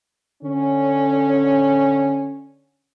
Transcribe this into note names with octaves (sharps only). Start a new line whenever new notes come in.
D3 C#4